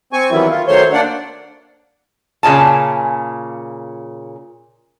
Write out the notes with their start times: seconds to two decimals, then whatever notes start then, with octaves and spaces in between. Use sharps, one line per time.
0.13 C4 G#5 C#6
0.31 D#3 E3 F#3 G3 B3 E4
0.50 F4
0.67 D#3 F#3 A3 C5 C#5 C6
0.93 A#3 D4 D5 F#5
2.43 A#2 C#3 G#5 A5